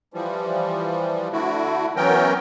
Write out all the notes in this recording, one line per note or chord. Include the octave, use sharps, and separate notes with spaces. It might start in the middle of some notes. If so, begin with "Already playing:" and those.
E3 F3 G3
D3 A3 E4 F#4
E3 F#3 B3 C#4 A#4 G5